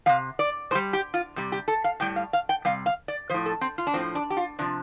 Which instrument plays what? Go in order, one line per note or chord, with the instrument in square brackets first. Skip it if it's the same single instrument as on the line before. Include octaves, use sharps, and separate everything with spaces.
[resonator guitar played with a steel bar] G3 F5
C3
D5
A2 C5
G3
G4
F4
C3 G3
G4
A4
F5
A2 G3 G5
F5
F5
G5
C3 G3 F5
F5
D5
A2 F3 C5
A4
C4
F4
D4
A2 F3 C4
D4
G4
F4
C3 F3 D4